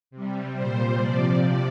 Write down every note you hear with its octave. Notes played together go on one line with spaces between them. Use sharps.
C3 G3
A#2 G3 C5
C3 F3 D5
C3 F3